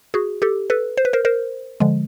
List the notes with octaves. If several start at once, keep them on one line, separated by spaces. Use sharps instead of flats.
F#4 G#4
G4 A4
A4 B4
C5
B4
A#4 C5
A#4 C5
D3 F3 G#3